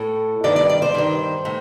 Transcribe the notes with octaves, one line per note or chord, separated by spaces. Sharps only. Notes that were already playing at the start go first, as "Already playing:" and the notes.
Already playing: A2 A4
G2 D#3 D5
D5
D5
C5
G2 D#3
A2